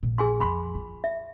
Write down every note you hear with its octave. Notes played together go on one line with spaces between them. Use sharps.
A#1 A#2
G#4 G#5 C6
F2 F3 B5 C6
F4
E5